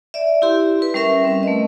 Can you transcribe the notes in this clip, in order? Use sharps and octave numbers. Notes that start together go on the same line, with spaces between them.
D5 E5
E4 G4 C6
B4
G3 C#4 A#4 E5
C4 C#4 B4
A3 D#5